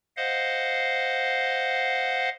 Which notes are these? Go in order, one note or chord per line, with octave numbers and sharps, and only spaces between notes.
C5 D#5 F5 F#5